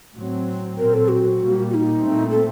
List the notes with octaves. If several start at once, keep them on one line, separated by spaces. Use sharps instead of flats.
A2 F#3 C4
A#2 F#3 C4 A#4
A4
F#4
A#2 G3 A#3
F#4
D#4
A#2 A3 C4
A4